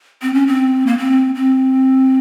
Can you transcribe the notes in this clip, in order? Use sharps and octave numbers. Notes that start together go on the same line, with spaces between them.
C4
C#4
C4
A#3
C4
C4